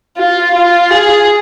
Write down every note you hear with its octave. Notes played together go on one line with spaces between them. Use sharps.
F4
F4
G#4